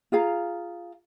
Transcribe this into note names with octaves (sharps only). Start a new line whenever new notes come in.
F4 G#4 F5 A#5